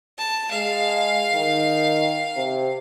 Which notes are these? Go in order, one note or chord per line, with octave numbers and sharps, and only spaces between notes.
A5
G#3 F5
D#3
C3